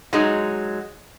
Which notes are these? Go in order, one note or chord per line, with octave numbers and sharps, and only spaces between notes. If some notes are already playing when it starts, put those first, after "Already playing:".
F#3 G#3 D#4